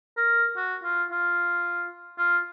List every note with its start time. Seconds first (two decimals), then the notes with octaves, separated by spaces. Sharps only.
0.17 A#4
0.57 F#4
0.84 F4
1.11 F4
2.18 F4